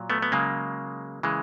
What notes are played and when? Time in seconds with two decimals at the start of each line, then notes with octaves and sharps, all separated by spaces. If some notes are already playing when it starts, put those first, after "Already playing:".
Already playing: A#2 F#3
0.10 A3 B3
0.22 B3
0.32 C#3 F#3 G#3 A#3
1.23 C#3 E3 G#3